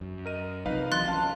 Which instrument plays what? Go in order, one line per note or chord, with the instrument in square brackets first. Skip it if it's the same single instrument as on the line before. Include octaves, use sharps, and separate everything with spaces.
[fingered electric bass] F#2
[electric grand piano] A#4 D#7 [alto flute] D#5
[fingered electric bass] B1 C3 F3 [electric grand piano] D#4 B4 F5 [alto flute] D#5
[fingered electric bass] E3 F#3 [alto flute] D#5 [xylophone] C6 F#6 A6
[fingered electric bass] F3 C#4 [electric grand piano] F5 [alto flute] A5